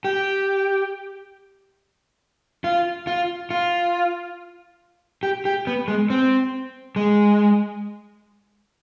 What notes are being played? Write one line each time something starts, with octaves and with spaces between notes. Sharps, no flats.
G4
F4
F4
F4
G4
G4
B3
G#3
C4
G#3